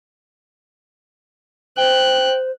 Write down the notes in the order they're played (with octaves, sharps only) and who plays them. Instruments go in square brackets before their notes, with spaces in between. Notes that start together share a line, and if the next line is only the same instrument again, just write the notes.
[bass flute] C5 [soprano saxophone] G5 [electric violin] F#6